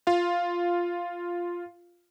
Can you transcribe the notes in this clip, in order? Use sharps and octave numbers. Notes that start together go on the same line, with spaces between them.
F4 F5